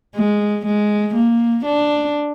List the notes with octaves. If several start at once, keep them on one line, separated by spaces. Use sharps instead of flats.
G#3
G#3
A#3
D4